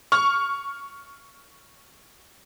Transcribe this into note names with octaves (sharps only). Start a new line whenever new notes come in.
C#6 F6